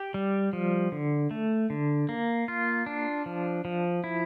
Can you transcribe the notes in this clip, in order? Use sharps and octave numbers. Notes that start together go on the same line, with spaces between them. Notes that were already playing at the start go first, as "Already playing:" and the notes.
Already playing: G4
G3
F3
D3
A3
D3
A#3
F4
D4
F3
F3
E4